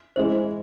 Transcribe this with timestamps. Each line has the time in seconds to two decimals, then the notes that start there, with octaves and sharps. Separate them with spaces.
0.16 E3 G#3 E4 C5